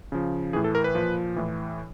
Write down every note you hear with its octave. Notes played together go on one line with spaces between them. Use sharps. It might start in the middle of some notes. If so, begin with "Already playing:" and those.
C#3 F3
A2 E3 G#4
A4
A#4
B4
A#2 F3
A2 E3